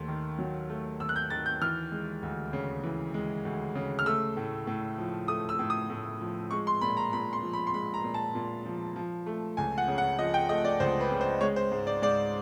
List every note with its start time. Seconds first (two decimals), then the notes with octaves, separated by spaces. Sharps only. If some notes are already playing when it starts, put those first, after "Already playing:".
Already playing: D#2 A3 C6
0.08 D#3
0.39 F#3
0.70 A3
1.00 D#2 E6
1.09 F#6
1.16 G6
1.30 D#3 A6
1.46 G6
1.61 E3 F6
1.92 G#3
2.23 D2
2.53 C#3
2.83 E3
3.14 G#3
3.45 D2
3.75 C#3
3.99 F6
4.06 A3 E6
4.37 A2
4.67 A2
4.98 F3
5.28 A3 D#6
5.49 E6
5.59 A2
5.70 D#6
5.90 A2
6.21 F3
6.51 G#3 C#6
6.67 C6
6.81 A#2 B5
6.97 A#5
7.13 A#2 B5
7.33 C6
7.43 F3
7.53 B5
7.67 C6
7.74 G#3 B5
7.94 A#5
8.04 A#2
8.14 A5
8.35 A#2
8.66 F3
8.96 F3
9.26 A3
9.57 C#2 G#5
9.78 F#5
9.88 C#3
9.98 F#5
10.18 F3 D#5
10.34 G5
10.49 A3 D#5
10.65 D5
10.80 C#2 C5
11.01 B4
11.11 C#3
11.21 C5
11.41 G#3 C#5
11.56 C5
11.72 G#2
11.87 D5
12.02 G#2 D5